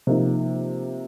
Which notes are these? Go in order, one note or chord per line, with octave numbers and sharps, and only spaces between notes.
C3 F3 A#3 D#4